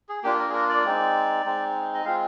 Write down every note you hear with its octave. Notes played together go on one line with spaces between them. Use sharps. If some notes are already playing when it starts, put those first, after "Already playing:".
G#4
A#3 D4 F4 G4
A#4
G#4
A#4
D5
G#3 C4 D#4
G#3 C4 D#4
D#5
G#3 C4 F4 F5